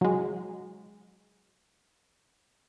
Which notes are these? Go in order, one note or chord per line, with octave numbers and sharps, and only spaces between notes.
F#3 G#3